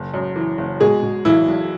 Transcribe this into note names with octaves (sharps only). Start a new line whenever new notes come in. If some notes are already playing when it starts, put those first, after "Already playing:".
Already playing: F#1
F#2
E3
F#1
B2 G#3 G#4
B2
B1 E3 E4
B1